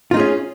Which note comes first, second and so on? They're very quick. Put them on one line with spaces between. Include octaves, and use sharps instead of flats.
F4 D#4 G#4 C#4